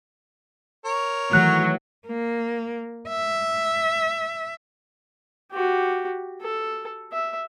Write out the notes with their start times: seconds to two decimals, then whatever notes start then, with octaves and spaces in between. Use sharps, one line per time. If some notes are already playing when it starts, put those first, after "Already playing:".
0.85 A#4 C#5
1.33 D#3 E3 F#3 A3 F#6
2.07 A#3
3.09 E5
5.52 F#4 G4
6.42 A4
7.13 E5